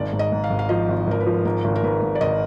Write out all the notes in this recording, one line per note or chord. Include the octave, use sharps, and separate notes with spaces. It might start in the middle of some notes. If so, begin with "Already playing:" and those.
Already playing: G#1 D5
G#2
D#5
G#2
F5
G#1
F5
F3 D#5
G#1
G#1 A#4
B4
F3
G#2 A#4
G#1
A#4
G#2 B4
G#2
D5
G#1 D#5